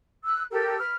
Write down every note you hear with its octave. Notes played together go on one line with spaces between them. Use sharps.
E6 F#6
G4 A4 A#4 E6
B4 F6